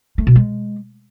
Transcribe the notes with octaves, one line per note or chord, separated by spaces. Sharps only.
A3
B2
G#3